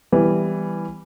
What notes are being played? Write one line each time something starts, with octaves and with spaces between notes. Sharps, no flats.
E3 G3 B3